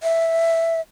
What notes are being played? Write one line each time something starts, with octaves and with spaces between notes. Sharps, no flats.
E5